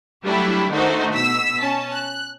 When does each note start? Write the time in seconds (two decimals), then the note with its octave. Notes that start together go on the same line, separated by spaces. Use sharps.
0.24 F#3 G3 A3 D4 E4 G4
0.72 D#3 A3 D4 D#4 F#4 C5
1.13 B2 E6 B6
1.61 C#4 A5
1.94 F#6